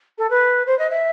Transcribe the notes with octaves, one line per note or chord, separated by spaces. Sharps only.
A4
B4
C5
D#5
E5